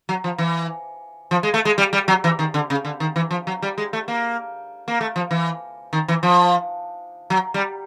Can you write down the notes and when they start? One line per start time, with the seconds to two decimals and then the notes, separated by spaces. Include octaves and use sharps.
0.09 F#3
0.24 F3
0.38 E3
1.31 F3
1.43 G#3
1.54 A3
1.65 G#3
1.78 G3
1.93 G3
2.08 F#3
2.24 E3
2.39 D#3
2.54 D3
2.70 C#3
2.85 D3
3.00 D#3
3.16 E3
3.31 F3
3.47 F#3
3.62 G3
3.78 G#3
3.93 A3
4.08 A#3
4.88 A#3
5.01 A3
5.16 F3
5.31 E3
5.93 D#3
6.08 E3
6.23 F3
7.30 F#3
7.54 G3